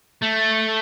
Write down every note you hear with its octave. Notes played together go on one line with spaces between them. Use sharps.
A3